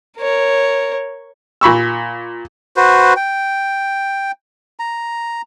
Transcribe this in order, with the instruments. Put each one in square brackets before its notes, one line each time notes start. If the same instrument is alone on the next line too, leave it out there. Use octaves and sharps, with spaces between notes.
[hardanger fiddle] A#4 C#5
[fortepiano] A#2 B5 C#6 E6
[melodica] F#4 B4 C5
G5
A#5